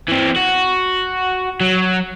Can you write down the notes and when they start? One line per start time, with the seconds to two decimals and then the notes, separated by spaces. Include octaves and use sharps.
0.08 E3 C4
0.36 F#4
1.61 F#3